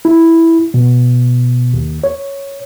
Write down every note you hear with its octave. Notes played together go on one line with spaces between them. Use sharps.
E4
B2
D#2
C#5